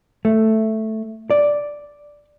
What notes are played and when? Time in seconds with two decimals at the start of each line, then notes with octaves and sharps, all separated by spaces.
0.25 A3
1.30 D5